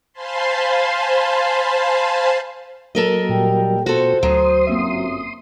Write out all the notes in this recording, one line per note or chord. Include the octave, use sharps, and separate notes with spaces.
C5 F5 G#5 A5 B5 C6
F#3 A#3 A4 A#4 D#5
A#2 G3 G5
B2 F4 F#4 A4 C5
D2 F#3 C6 D#6
G1 F#2 A#3 C4 E5